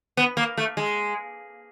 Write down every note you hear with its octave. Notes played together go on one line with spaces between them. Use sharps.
B3
A#3
A3
G#3